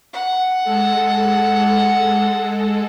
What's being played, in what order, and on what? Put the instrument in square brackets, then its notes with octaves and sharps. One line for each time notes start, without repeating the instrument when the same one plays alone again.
[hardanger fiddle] F#5
[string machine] G#3 A4